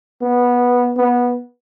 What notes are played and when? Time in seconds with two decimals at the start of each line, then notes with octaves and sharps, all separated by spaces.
0.22 B3
0.97 B3